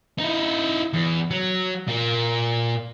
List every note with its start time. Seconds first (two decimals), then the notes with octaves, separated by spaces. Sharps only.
0.19 D#4 E4
0.94 E2
1.31 F#3
1.88 A#2 A#3